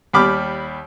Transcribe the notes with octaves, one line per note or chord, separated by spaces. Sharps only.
D#2 G3 B5 D6 F6